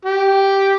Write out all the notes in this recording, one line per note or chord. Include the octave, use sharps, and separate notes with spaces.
G4